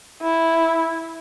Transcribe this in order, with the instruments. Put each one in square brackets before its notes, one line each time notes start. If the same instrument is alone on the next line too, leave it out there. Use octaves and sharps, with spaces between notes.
[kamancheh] E4